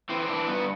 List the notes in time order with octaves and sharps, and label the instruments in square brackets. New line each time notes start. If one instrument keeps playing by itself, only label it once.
[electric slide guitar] E3 C4
C4
E3 D4
G2 B3